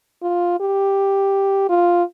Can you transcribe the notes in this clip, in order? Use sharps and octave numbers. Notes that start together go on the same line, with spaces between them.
F4
G4
F4